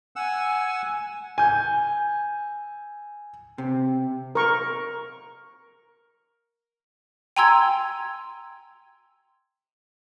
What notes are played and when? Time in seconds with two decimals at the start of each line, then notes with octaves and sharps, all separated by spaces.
0.16 F#5 G#5 E6
1.38 G#5 G6
3.58 C3
4.35 A#4 C#6
7.37 G5 G#5 A#5 C6 E6 G#6